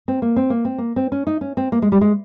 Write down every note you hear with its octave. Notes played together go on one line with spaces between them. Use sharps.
C4
A#3
C4
A#3
C4
A#3
C4
C#4
D#4
C#4
C4
A#3
G#3
G3
G#3